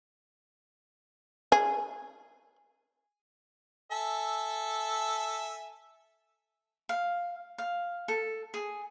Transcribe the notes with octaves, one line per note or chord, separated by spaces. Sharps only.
G#4
A4 E5 G#5
F5
F5
A4
G#4